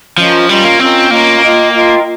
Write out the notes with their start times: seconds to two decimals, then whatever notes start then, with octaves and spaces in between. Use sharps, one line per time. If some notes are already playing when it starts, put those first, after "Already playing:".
0.17 F3 C#4 F4 A#4 D#5
0.49 G3 C#4 F4 A#4 D#5
0.65 A#3
0.79 C4 C#4 F4 A#4 D#5
1.11 A#3 C#4 F4 A#4 D#5
1.42 F4 A#4 D#5 G5
1.72 F4 A#4 D#5 G5